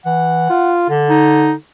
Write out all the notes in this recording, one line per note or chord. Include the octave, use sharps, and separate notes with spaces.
E3 F#5
F4
D3
D#4